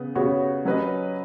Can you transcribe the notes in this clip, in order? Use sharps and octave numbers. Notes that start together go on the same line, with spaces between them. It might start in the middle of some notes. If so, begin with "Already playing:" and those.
Already playing: C#3 B3
C#3 B3 F#4 C#5
F#3 C#4 B4 D#5